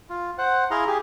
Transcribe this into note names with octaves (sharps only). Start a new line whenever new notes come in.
F4
C5 F#5
E4 G#4 F5 A#5 C6
G4 G#4